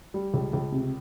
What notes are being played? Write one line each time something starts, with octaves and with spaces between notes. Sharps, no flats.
G3
C#2
C#2
C3